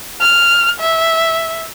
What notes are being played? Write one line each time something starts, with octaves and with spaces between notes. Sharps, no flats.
F6
E5